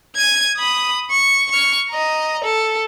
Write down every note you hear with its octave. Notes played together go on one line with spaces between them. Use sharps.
G#6 D#7
B5 D#6
C#6
C#6 F6
D#5 A#5
A4